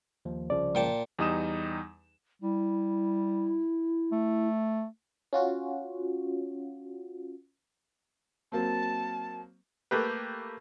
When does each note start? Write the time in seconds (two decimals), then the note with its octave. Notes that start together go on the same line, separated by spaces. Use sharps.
0.25 D#2 F3
0.50 C2 C#3 F3 D5
0.75 A#2 G5 A5
1.19 E2 G3 D#4 D#6 E7
2.42 G3 E4
4.12 A3
5.33 C#4 F4 F#4
8.52 F#3 A#3 C4 A5
9.91 A3 A#3 G4 B4